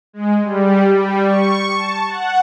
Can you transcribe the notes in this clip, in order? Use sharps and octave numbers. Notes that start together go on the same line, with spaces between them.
G#3
G3
G3
C#6
A5
F#5